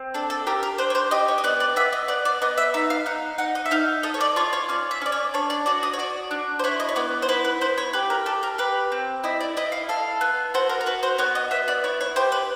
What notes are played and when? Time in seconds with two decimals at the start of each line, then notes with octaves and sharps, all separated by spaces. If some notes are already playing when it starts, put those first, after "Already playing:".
Already playing: C4
0.14 D4 A4
0.30 A4
0.47 G4 A#4
0.63 A#4
0.78 D4 C5
0.90 C#5
0.95 C5
1.11 G4 D#5
1.28 C#5
1.38 D#5
1.44 B3 D5
1.60 D5
1.76 B3 E5
1.93 D#5
2.08 B3 D5
2.25 D5
2.42 B3 D#5
2.58 E5
2.74 D#4 E5
2.90 F5
3.06 D#4 F#5
3.38 D#4 F#5
3.55 D#5
3.66 E5
3.71 D#4 F5
4.03 A4 D#5
4.14 C#5
4.21 D5
4.36 F4 C#5
4.53 C#5
4.69 C#4 D5
4.91 E5
5.02 C#4 D5
5.12 C#5
5.34 D4 C#5
5.50 D5
5.66 F#4 D5
5.83 D#5
5.93 C#5
5.99 F#4 D5
6.31 D4
6.59 C5
6.64 E4 C#5
6.80 D#5
6.89 C#5
6.96 B3 D5
7.22 C5
7.29 E4 B4
7.45 B4
7.61 E4 C5
7.78 C#5
7.93 G4 B4
8.10 A#4
8.26 G4 A4
8.43 A#4
8.58 G4 B4
8.92 C4
9.24 E4 D#5
9.41 D5
9.57 E4 D#5
9.72 F5
9.89 A4 F5
10.21 B3
10.54 F#4 C5
10.69 A#4
10.81 A#4
10.86 F#4 B4
11.03 C5
11.18 B3 C#5
11.35 D#5
11.51 B3 E5
11.68 D5
11.84 E4 C#5
12.01 C#5
12.16 G4 C5
12.32 B4